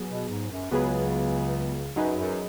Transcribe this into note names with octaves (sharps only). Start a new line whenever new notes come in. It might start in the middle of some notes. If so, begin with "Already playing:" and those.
Already playing: F#3 B3 G#4
B2
G#2
F#2
C#2 C#3 F#3 B3 G#4 B4
F#2 F#3 D#4 G#4 B4
F#2